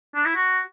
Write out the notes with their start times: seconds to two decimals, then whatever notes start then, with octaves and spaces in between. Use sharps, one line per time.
0.15 D4
0.25 E4
0.36 F#4